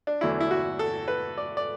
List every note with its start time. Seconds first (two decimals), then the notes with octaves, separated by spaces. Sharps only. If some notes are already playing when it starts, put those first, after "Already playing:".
0.07 D4
0.21 E2 D3 F#3 A3 E4
0.40 E4
0.51 F#4
0.79 A4
1.08 B4
1.37 D5
1.57 D5